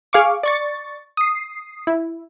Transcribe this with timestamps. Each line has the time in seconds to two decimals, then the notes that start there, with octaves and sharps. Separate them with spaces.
0.13 G#4 F5 C#6 D6
0.43 D5 C#6 A6
1.17 D#6 C7
1.87 E4